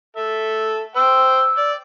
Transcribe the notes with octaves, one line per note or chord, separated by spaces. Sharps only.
A4 E5
C5 G5 E6
D5